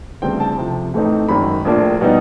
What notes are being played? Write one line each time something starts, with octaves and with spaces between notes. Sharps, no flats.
D2 C#3 E3 G3 C4 G5
A5
F2 C3 F3
A2 E3 A3 C4 D#4
G#1 F#2 D#3 B5
A#1 A2 F3 A#3 D4
B2 G3 B3 D#4